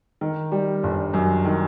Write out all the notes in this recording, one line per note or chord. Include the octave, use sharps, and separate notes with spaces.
D#3
G3
G1
F#2
D#3